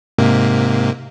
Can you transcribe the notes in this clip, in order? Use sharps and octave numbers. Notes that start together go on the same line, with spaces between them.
G#2 C3 A#3